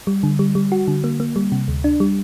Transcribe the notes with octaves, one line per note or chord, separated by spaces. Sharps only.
G3
D3
G3
G3
F#4
D3
A#3
A#3
G3
C3
D2
D4
G3